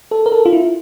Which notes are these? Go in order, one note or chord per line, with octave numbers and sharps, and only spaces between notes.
A4
A#4
A4
F4
E4